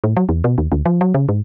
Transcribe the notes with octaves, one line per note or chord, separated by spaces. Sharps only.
A2
F#3
E2
B2
D#2
D2
F3
F#3
C#3
G#2